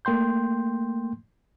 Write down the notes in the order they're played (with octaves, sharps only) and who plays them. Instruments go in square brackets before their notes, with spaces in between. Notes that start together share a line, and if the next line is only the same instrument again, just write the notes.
[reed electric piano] A3 A#3 G5 C6 G6